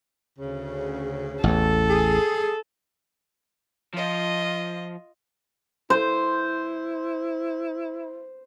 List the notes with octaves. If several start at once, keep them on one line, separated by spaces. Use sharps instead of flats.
D2 C#3
A1 E2 A4
G#4
F3 F4 D#5
E4 C5